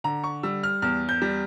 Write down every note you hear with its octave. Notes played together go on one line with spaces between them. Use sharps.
D3 A#5
C#6
G3 E6
F6
E2 F6
G6
G3